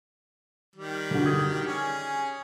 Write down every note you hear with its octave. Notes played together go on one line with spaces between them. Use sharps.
D#3 G3
D3 F#4
D#6 G#6
C#4 G#4